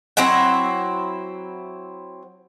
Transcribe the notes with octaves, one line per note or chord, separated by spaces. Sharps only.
F#3 C4 E4 F#5